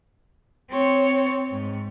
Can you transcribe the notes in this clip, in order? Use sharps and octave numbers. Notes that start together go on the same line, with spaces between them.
C4 C#5
G#2